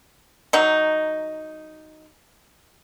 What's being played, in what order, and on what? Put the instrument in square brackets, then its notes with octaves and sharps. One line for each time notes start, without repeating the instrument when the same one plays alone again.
[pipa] F#3 D#4